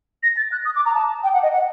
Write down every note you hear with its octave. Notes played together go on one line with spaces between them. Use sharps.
A#6
A6
F#6
D#6
D6
A#5
A5
G5
F#5
D#5
F#5